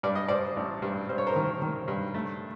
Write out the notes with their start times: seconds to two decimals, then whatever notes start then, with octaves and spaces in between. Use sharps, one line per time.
0.03 G2 D5
0.15 D#5
0.29 G2 C5 D5
0.56 A1
0.82 G2
1.09 G2 C5
1.18 C#5
1.27 A#4 C5
1.36 D#3
1.62 D#3
1.88 G2
2.14 A3